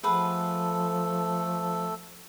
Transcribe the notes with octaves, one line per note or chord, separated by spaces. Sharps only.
F3 A3 G#4 A4 B4 F#5